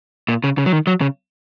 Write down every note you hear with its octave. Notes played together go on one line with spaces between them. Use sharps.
A#2
C#3
C#3
F#3
D#3
F#3
C#3